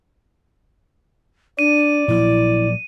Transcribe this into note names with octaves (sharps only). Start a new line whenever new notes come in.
D4 D5 D#7
A#2 F3 F#3 E4